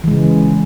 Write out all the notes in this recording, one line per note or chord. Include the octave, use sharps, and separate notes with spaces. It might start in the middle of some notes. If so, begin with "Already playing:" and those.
C#3 E3 G#3